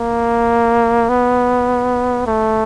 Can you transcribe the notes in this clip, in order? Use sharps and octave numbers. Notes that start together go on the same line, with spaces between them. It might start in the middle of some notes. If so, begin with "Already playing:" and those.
Already playing: A#3
B3
A3